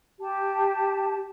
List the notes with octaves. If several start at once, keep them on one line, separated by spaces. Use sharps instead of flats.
G4 A5